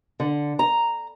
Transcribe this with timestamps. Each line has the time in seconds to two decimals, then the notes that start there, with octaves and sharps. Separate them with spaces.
0.20 D3
0.59 A#5